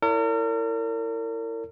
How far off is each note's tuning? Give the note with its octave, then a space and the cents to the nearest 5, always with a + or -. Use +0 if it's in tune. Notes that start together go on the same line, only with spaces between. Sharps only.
E4 +0 A#4 -40 C#5 +45